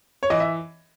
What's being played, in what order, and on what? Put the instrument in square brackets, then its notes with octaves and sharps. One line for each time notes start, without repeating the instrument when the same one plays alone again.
[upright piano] C#5
E3 D#5
E5